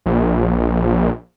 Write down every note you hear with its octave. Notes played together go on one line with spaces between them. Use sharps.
A#1